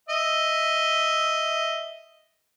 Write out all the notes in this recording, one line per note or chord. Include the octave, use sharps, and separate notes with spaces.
D#5 E5